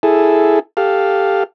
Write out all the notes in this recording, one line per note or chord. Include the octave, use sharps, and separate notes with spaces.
E4 G#4 A4
G4 A4 F5